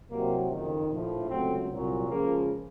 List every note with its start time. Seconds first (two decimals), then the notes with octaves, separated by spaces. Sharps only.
0.10 C2 C3 F#3 A#3
0.50 F#1 F2 D#3
0.90 A#1 A2 F3
1.29 C#2 C3 F#3 A3 C4
1.70 C2 A#2 F#3
2.10 C#2 C#3 F3 A#3